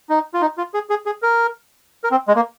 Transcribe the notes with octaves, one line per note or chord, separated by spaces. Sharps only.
D#4
F4
D#4
F4
G#4
G#4
G#4
A#4
A#4
C4
G#3
A#3